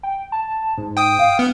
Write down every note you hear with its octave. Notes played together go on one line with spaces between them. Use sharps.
G5
A5
G#2
G5 D#6
F5
B3 F6